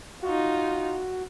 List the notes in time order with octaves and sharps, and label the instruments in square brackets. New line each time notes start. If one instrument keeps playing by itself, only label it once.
[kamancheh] D#4 F4 [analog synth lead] F#4